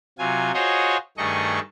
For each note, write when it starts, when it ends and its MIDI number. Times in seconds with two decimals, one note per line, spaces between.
0.19 0.52 48
0.19 0.52 54
0.19 0.52 65
0.19 0.52 80
0.54 0.97 65
0.54 0.97 66
0.54 0.97 68
0.54 0.97 72
0.54 0.97 73
0.54 0.97 75
1.18 1.60 43
1.18 1.60 51
1.18 1.60 57
1.18 1.60 68
1.18 1.60 75
1.18 1.60 85